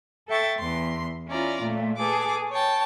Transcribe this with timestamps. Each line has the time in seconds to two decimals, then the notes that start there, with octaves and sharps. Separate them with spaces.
0.28 A4 E5 G5 C#6 A6
0.58 E2 C6
1.27 C#4 E4 F4 D5 A#5
1.61 A#2 A3
1.96 G#4 A4 B4 D6
2.51 C#5 G5 A5